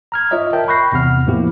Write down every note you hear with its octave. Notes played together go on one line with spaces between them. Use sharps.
A#5 F6 G#6
F4 C#5 D#5 E5
A#4 E5 G5 A5 G6
B5 C#6 F#6 G6 A#6 C7
E2 C3 F#5 F6
A2 F3 A#3 B3 E4 G4